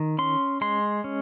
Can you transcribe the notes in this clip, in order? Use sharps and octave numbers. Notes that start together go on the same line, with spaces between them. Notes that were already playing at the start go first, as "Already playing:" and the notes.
Already playing: D#3
C#4 C6
G#3 C6
C#4